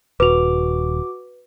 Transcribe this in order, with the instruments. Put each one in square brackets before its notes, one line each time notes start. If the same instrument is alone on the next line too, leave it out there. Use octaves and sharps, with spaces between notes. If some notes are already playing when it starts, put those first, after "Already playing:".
[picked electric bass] D#1 [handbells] F#4 D6 [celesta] B4 F7